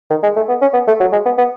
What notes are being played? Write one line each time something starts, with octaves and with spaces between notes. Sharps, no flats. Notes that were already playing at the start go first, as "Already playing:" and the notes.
D#3
G#3
A3
B3
C#4
B3
A3
F#3
G#3
B3
B3